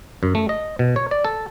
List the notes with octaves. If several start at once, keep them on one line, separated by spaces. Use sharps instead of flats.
F#2
A3
D#5
B2
C#5
D5
A4